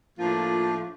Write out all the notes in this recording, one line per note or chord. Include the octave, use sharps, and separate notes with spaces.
A2 F3 A3 A#3 D4 F4